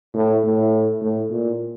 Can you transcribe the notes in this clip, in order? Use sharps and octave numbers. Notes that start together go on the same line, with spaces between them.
A2
A2
A2
A#2